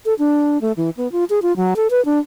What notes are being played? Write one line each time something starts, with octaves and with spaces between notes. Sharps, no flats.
A4
D4
A3
E3
B3
F4
G#4
F4
F#3
A4
B4
D4